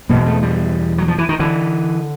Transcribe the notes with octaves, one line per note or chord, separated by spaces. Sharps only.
E2 B2 A#3
A3
G3
F#3
F3
E3
D#3
D3 E3